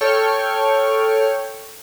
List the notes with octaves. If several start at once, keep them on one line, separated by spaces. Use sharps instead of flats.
A4 C#5 G5 C#6 F6